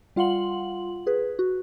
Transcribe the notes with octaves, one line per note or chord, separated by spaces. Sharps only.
G3 F4 F5 F#5 C6 F#7
G#4 B4
F#4